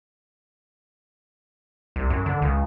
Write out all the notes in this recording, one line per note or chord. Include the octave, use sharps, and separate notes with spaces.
C2
F#2
D3
C#2